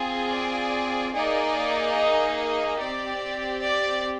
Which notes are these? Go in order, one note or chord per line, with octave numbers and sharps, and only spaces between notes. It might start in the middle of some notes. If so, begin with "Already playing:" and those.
Already playing: C4 F4 G#4
D5
A#3 D#4 G#4 D5
D#5
D#5
C4 G4 D5
D5